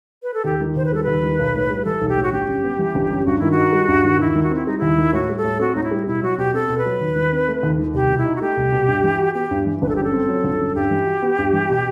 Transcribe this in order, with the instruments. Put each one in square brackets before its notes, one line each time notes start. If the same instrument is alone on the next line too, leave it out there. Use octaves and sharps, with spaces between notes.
[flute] B4
A4
[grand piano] D#2 [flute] G4
[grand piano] D#3
[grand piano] D#2 [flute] C5
[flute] B4
[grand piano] G3 [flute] A4
[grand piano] D#2 [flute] B4
[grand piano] D#3
B1
A2
G3
[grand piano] E3 [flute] A4
[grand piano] B1
[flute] G4
[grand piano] A2
[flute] F#4
[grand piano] G1 [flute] G4
[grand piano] F#2
B3
E3
G1
F#2
[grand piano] G2 [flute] F#4
[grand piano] D#3 [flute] E4
[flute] F#4
[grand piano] D#4
G3
G2
D#3
[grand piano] D#2 [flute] E4
[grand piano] D#3
[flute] F#4
[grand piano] C4 [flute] E4
[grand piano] G3 [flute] D#4
[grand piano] D#2 [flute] E4
[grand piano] D#3
[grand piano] A2 [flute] F#4
[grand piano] G3
[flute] A4
[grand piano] A2
[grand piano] C4 [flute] F#4
[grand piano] A2 [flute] D#4
[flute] E4
[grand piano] G3
[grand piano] B2 [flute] E4
[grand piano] F#3 [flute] F#4
[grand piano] B2 [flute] G4
[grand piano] C4 [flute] A4
[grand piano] B2
[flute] B4
[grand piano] F#3
D#2
D#3
C4
A3
D#2
D#3
[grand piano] C2 [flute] G4
[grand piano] B2
[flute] E4
[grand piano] D#4
[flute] F#4
[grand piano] A3 [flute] G4
[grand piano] C2
B2
G2
E3
F#4
[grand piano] B3 [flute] G4
[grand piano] G2
E3
[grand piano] G1 [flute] B4
[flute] A4
[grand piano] F#2 [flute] G4
[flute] A4
[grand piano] C4
F#3
G1
F#2
[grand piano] G2 [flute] G4
[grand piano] E3
F#4
B3
G2
E3
B2